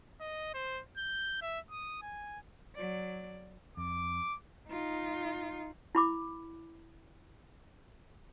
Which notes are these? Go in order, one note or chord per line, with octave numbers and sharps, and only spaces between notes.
D#5
C5
G6
E5
D#6
G#5
F#3 D5
F2 D6
D#4 F4
E4 B5 D6